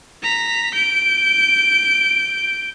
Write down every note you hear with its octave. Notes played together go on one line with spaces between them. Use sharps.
A#5 B6
G6 D7